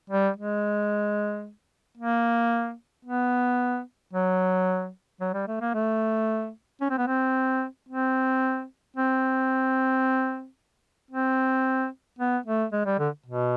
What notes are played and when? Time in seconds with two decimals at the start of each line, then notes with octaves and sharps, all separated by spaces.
0.10 G3
0.37 G#3
1.98 A#3
3.05 B3
4.13 F#3
5.20 F#3
5.34 G3
5.48 A3
5.61 A#3
5.74 A3
6.81 C#4
6.90 C4
6.98 B3
7.07 C4
7.89 C4
8.96 C4
11.11 C4
12.19 B3
12.46 A3
12.72 G#3
12.86 G3
12.99 D3
13.26 B2